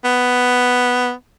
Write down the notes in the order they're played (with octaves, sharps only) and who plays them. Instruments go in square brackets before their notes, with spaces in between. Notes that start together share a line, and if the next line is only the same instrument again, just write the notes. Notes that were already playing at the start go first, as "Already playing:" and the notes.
[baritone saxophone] B3